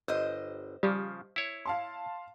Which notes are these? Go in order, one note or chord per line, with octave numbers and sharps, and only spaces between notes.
G1 C5 D#5
C#3 F3 G3
E4 C#5
F5 A5 C6